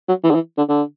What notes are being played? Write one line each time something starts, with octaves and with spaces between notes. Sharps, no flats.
F#3
E3
D3
E3
D3
D3